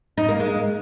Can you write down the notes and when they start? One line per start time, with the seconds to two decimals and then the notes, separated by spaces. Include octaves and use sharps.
0.17 D#4
0.29 A#3
0.40 G#3